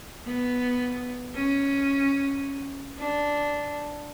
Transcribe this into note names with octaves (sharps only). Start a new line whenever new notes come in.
B3
C#4
D4